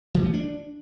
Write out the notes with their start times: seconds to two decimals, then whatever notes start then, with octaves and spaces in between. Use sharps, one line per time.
0.14 E3
0.24 A3
0.33 D4